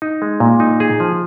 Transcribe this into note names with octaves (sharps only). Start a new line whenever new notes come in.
D#4
G#3
A#2
D#4
G#4
F3